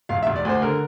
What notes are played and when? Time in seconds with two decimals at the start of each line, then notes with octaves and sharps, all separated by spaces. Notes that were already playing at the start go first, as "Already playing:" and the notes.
0.09 E1 F5
0.23 E5
0.27 E1
0.36 D5
0.45 D2 C5
0.62 D3 A#4